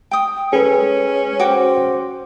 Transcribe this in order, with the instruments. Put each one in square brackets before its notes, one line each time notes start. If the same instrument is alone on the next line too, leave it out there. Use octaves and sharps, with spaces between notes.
[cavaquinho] G5 D#6
[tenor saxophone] C#4 [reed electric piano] G#4 B4 [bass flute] A4
[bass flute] G#3
[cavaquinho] F#4 G5 D6 [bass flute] C5